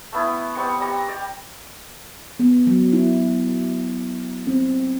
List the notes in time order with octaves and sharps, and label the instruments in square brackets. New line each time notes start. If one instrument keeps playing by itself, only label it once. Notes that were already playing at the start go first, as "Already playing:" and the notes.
[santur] A3 B3 E4
G3 B3 C4 C#6
G3 A#5 C#6
G4 D5
[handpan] B3
F#3
E4
C4